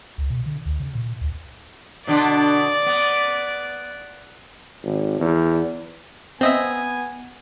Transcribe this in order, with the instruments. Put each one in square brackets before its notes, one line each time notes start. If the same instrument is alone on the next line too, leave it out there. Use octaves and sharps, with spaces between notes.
[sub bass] C#2
B2
D3
D2
C#3
A#2
D2
[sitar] B2 D3 D4 [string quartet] D5
[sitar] B3
[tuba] G#1
E2
[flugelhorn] B3 [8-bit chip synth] C4 D#5 E5 [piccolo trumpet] G#5